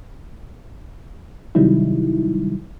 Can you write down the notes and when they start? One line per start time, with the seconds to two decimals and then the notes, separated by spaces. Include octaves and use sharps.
1.55 C3 D#3 F#3 G3 D#4 E4